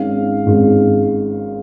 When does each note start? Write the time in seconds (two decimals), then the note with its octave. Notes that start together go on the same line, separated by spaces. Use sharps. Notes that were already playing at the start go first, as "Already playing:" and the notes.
Already playing: G#1 G#2 G#3 C#4 F5
0.46 G#1 G#2 G#3 C#4